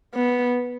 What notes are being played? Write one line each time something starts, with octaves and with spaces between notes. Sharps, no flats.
B3